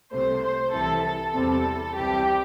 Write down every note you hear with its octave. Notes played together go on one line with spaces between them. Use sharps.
C2 C3 A3 C5
C5
C2 C3 E3 A4
A4
E2 C3 G3 C4
C2 C3 E3 G3 C4 G4